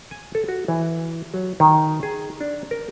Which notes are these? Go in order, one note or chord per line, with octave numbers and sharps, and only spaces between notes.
G#5
A4
F#4
E3
F#3
D#3
G#4
D4
A#4